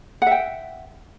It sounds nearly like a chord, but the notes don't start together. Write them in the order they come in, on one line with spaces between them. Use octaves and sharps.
F#5 E5 G5